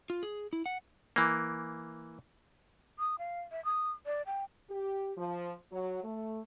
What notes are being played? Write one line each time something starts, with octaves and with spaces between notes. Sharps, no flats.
F4
G#4
E4
F#5
E3 A#3
D#6
F5
E5
D#6
D5
G5
G4
F3
F#3
A3